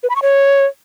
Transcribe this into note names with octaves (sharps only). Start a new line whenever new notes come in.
B4
B5
C#6
C#5